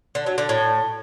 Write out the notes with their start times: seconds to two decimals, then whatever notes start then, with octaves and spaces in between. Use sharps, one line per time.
0.15 D3
0.26 F#3
0.38 D3
0.49 A2